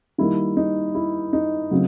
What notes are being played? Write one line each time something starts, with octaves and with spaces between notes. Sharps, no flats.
D#3 G3 A#3 E4
D#4
E4
D#4
C#3 F#3 A3 C4